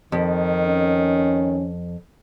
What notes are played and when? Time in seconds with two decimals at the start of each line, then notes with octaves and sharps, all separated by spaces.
0.12 F2 D#3
0.66 C#4